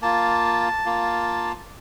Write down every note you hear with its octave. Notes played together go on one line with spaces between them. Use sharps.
A#3 F4 A5
A#3 F4